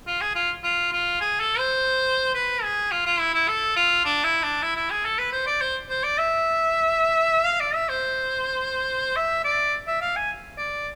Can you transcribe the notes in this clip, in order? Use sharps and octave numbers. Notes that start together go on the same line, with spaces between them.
F4
G#4
F4
F4
F4
G#4
A4
C5
B4
G#4
F4
F4
E4
E4
A4
F4
D4
E4
D4
E4
E4
G#4
A4
B4
C5
D5
C5
C5
D5
E5
F5
D5
E5
C5
E5
D5
E5
F5
G#5
D5